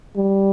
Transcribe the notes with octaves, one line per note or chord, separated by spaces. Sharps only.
G3